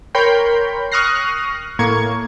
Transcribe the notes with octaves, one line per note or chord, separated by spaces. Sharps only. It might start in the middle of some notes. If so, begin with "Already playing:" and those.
A#4 C#5 G5 B5 C6 G6
C#6 D#6 F6 F#6 A#6 C7
A2 A#3 C#6 G#6